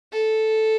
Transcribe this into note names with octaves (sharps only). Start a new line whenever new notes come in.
A4